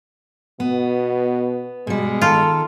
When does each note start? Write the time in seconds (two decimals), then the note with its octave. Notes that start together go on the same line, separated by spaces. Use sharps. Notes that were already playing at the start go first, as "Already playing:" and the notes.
0.60 B2 B3
1.87 B2 G3 G#3
2.21 D#3 F4 A4